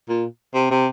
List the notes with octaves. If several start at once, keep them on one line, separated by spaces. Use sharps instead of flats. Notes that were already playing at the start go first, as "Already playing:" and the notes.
A#2
C3
C3